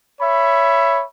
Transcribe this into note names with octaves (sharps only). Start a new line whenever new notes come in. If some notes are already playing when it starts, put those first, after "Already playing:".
C#5 E5 B5